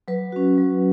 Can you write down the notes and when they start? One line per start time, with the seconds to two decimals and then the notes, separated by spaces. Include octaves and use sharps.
0.08 F#3 B4
0.32 C#4 F#4
0.58 F#3